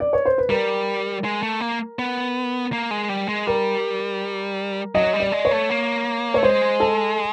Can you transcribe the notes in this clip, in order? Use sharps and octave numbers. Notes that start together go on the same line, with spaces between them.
D5
C#5
C5
B4
G3 A#4
G#3
A3
A#3
B3
A#3
G#3
G3
G#3
G3 A#4
F#3 D#5
G3
D5
G#3
C#5
A3
A#3
A3 C#5
G#3 C5
A4